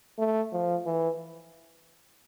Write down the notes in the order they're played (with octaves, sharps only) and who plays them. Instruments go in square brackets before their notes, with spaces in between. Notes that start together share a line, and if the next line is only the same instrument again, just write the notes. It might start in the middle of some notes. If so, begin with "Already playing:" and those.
[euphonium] A3
F3
E3